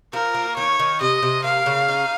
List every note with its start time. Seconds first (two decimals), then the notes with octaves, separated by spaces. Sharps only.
0.13 F3 A#4
0.35 A#3
0.57 D#3 C#5
0.79 D#3
1.01 C3 D#5
1.23 C3
1.44 A#3 F5
1.66 C#3
1.88 D#4